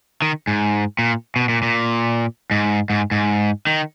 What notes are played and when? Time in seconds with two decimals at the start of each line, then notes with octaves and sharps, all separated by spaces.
0.22 D#3
0.47 G#2
0.99 A#2
1.36 B2
1.49 A#2
1.63 A#2
2.51 G#2
2.90 G#2
3.11 G#2
3.67 D#3